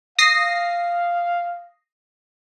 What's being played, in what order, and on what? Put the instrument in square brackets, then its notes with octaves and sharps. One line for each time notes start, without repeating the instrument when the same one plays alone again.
[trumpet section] F5 [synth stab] D#6 A#6 C7